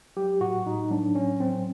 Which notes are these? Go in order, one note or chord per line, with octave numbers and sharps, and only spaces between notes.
F#3 G4
A2 F#4
A2 D#4
F#3 D4
A2 C#4
F#3 C4